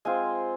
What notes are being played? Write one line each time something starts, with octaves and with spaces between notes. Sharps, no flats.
G#3 C4 F4 G#5